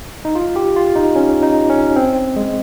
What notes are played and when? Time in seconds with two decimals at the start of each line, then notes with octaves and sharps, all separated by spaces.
0.25 D#4
0.35 F4
0.56 G4
0.76 F4
0.95 D#4
1.16 C#4
1.43 D#4
1.70 C#4
1.96 C4
2.36 G#3